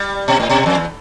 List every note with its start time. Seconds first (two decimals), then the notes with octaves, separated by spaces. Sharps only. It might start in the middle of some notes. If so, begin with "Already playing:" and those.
Already playing: G3
0.28 B2
0.40 A2
0.50 B2
0.66 F2
0.75 E2